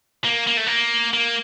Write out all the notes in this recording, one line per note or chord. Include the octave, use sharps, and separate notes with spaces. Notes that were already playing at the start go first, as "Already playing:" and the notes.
A#3
A#3
A3
A#3
A#3